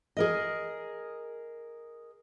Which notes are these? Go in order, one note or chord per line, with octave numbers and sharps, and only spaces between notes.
G#4 A#4 D#5